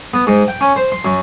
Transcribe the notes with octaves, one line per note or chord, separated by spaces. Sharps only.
B3
G#2
G5
C#4
C5
C6
F#2